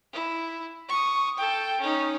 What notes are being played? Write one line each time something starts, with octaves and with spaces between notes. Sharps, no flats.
E4
C#6 D#6
A4 G5
C#4 D#4